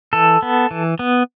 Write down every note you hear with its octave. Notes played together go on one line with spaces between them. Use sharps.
E3 A4
B3
E3
B3